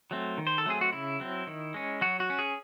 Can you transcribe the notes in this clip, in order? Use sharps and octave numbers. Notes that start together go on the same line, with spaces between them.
F#3 A3 C4
D#3
C5
A4
F#3 A3 C4 G#4
F#4
C#3 E4
F#3 C4
D#3
G#3 C#4
F#3 F#4
F#4
C#4
G#4